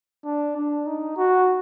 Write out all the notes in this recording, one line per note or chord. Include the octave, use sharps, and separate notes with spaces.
D4
D4
D#4
F#4